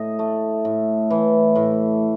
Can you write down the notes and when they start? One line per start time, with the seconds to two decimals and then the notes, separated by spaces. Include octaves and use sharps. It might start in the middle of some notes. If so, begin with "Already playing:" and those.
Already playing: A2 D#5
0.19 A3
0.65 A2
1.10 E3
1.55 A2